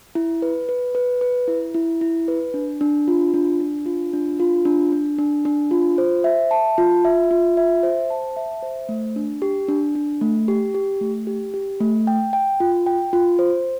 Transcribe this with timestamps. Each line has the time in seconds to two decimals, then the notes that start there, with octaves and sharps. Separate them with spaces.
0.15 E4
0.42 B4
0.69 B4
0.95 B4
1.21 B4
1.48 E4
1.74 E4
2.01 E4
2.28 B4
2.54 D4
2.81 D4
3.08 F4
3.34 D4
3.60 D4
3.86 F4
4.13 D4
4.40 F4
4.65 D4
4.92 D4
5.19 D4
5.45 D4
5.71 F4
5.98 C5
6.24 E5
6.51 A5
6.78 F4
7.05 E5
7.31 F4
7.57 E5
7.83 C5
8.10 A5
8.37 E5
8.63 C5
8.89 A3
9.16 D4
9.42 G4
9.69 D4
9.95 D4
10.21 A3
10.48 G4
10.75 G4
11.01 A3
11.27 G4
11.54 G4
11.80 A3
12.07 G5
12.33 G5
12.60 F4
12.86 G5
13.13 F4
13.39 C5